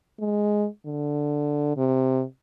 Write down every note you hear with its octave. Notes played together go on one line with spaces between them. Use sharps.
G#3
D3
C3